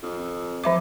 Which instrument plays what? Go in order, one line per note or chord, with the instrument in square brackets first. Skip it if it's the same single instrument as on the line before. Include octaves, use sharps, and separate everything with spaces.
[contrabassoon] F2
[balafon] F3 E5 D6